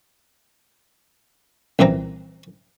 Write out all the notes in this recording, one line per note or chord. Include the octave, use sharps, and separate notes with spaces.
C2 A#2 E3 C4 A#5